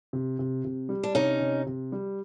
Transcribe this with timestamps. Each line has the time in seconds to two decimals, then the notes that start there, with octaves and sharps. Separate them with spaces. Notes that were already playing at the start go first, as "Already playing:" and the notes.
0.13 C3
0.39 C3
0.65 C3
0.89 G3
1.03 D4
1.15 C3 C#4 D#4
1.40 C3
1.66 C3
1.92 G3